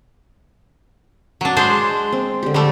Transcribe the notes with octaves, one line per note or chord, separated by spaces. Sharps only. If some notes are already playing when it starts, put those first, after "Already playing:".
F#3 D4
G#3 D4 C5
C4
D3 G4
D3 G3 A3 A4 D5